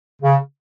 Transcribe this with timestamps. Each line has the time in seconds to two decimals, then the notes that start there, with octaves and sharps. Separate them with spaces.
0.22 C#3